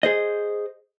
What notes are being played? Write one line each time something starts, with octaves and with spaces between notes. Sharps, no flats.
G#4 C5 D#5